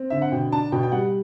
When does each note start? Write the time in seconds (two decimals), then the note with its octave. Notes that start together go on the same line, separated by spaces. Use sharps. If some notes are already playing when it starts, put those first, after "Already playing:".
Already playing: C4
0.10 D3 E5
0.22 F#5
0.32 B2 G5
0.52 D4 A5
0.72 B2 G5
0.83 G5
0.92 G3 F#5